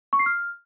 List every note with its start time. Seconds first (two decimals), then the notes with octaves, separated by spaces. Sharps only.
0.13 C#6
0.19 C7
0.26 F6